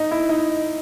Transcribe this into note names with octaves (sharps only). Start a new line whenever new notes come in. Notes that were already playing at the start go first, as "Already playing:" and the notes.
Already playing: D#4
E4
D#4